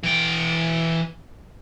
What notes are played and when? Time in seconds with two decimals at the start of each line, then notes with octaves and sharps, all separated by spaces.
0.03 E3 G5